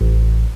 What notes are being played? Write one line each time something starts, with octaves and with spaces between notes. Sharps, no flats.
A1